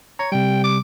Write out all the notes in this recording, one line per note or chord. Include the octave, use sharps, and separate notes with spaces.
C#5 A#5
C3 G3 G5
D6